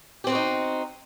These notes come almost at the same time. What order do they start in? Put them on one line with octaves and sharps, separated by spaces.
G4 C4 B3 F#4 D#4